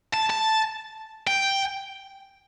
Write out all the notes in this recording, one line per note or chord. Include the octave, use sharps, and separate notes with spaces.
A5
A5
G5